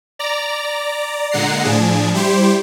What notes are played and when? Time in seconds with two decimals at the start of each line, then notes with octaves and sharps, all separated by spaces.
0.19 D5 A#5
1.31 A#2 D3 G#3 F#5 A#5 C7
1.64 A2 F3 D4 G#4
2.14 G3 E4 G4 C5